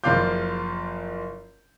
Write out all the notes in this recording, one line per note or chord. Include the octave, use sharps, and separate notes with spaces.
F#1 F3 F4 F5 D6 G6